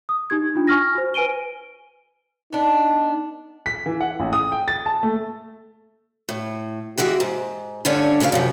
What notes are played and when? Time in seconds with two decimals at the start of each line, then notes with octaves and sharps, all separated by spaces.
0.09 D#6
0.30 D#4 G4 G#6
0.55 D4 F4
0.67 G#5 C#6 F6 A#6
0.95 F#4 C5
1.14 B4 G#5 D7 D#7 G7
2.53 B3 D4 D#4
3.66 B6
3.86 E3
4.01 F#5
4.20 A1
4.33 D#6
4.52 G5
4.68 A6
4.86 A5
5.03 A3
6.29 A2
6.98 E3 G#3 F#4 G4
7.20 G#2
7.85 G2 D3 A3 C#4 D4
8.20 D2 C#3 E4 B4 F5
8.32 F#2 C3 F3